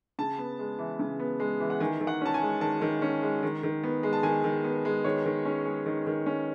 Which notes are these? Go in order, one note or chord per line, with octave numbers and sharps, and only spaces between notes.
C#3 A5
B3
G#3
E3
C#3
B3
G#3
E3
F#5
D#3 G#5
D#3
F#5
C#4 A5
G#5
G#3
D#3 A5
D#3
C#4
G#3
D#3
D#3
B3
G#3
A5
D#3 G#5
D#3
B3
G#3
D#3 C#5
D#3
C#4
G#3
D#3
D#3
C#4